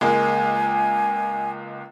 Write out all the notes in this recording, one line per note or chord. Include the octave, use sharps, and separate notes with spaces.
C#2 G#3 A#3 G#5